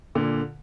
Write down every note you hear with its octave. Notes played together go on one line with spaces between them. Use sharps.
A#2 D3